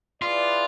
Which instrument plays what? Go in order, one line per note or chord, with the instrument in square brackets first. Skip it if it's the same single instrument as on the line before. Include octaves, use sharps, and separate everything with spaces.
[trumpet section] E4 G#4 B4 D5 [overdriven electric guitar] F4